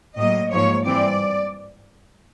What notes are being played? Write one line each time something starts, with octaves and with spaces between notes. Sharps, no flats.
A2 F#3 A#3 D#5
G#2 F3 A#3 C#5
G2 E3 G3 C4 D5